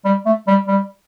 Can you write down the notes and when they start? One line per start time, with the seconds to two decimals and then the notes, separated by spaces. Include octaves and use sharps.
0.05 G3
0.26 A3
0.47 G3
0.68 G3